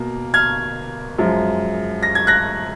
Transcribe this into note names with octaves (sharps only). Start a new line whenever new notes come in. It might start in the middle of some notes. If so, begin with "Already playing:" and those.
Already playing: B2 A#3
F6 G#6
F#2 F3 G#3
A#6
G#6
F#6 A#6